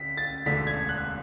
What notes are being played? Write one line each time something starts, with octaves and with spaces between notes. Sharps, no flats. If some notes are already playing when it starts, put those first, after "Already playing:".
Already playing: D2 B6
A6
E1 D2 D3 B6
G#6
F#6